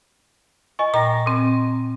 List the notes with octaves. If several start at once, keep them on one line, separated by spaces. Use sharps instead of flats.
D#5 G#5 C#6
A#2 D#5 G5 A#5 A#6
A#2 C4